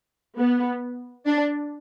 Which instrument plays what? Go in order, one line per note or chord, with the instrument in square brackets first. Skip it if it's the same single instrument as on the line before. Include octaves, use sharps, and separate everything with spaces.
[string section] B3
D4